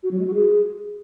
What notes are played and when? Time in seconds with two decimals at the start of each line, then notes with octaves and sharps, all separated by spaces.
0.03 F#4
0.11 F#3
0.18 G#3
0.26 F#4
0.34 G#4